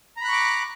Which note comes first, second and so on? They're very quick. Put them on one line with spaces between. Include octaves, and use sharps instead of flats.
A#5 B5 F#6 C#6 D6